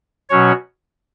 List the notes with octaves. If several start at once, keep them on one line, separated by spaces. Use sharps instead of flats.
B2 F#3 C#4 F#4 C#5